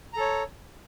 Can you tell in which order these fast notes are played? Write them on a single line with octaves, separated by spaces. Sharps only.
A#5 A4 C#5